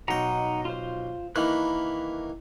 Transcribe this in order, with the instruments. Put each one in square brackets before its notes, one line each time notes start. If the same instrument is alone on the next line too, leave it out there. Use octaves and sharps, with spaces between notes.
[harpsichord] B1 G5 [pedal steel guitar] D#4 F#5 A#5
[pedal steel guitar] F4 C5
[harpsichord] D#3 E3 A#3 [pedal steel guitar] B5 F#6